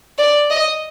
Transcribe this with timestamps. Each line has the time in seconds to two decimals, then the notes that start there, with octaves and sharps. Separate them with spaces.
0.18 D5
0.50 D#5